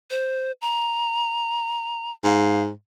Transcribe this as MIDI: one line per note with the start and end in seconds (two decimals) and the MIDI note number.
0.11 0.52 72
0.61 2.11 82
2.24 2.70 44
2.24 2.62 77